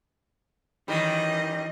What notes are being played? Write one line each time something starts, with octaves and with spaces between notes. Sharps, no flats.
F#2 D#3 E3 G3 D#5